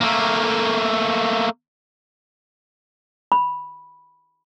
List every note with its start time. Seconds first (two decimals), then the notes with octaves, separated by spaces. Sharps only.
0.01 A3 A#3
3.32 B5